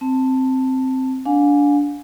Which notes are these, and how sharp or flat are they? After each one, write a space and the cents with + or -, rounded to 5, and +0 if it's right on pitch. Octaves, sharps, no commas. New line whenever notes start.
C4 +0 A5 +10
D4 -20 F5 +40 G#5 +0